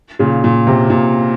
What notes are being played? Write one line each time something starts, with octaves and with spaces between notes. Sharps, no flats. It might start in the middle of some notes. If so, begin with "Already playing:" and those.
A#2 C#3
A#2
C3
A#2